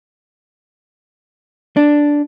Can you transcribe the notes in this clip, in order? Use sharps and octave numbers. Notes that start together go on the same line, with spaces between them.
D4